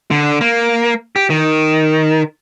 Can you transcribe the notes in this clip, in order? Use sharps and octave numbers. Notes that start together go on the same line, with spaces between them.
D3
A#3
G4
D#3